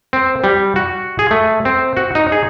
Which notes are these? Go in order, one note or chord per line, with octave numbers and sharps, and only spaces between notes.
C4
G3
F#4
G#4
A3
C4
F#4
D#4
G#4